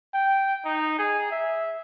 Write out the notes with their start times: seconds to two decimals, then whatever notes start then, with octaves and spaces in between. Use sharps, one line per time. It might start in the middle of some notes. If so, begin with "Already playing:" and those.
0.14 G5
0.65 D#4
0.99 G#4
1.32 E5